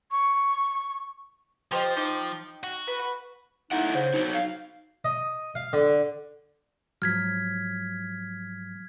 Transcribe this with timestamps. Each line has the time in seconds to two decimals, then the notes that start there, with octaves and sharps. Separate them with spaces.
0.11 C#6
1.72 F3 G4 C5 D#5
1.97 D#4 G5 D6
2.63 F#4
2.87 B4
3.71 A3 D#4 E4 F#5
3.95 C#3 C5
4.14 F#3 D#4
4.35 F5
5.05 D#5
5.55 F5
5.73 D3
7.02 G#2 F3 F#3 F6 G#6 B6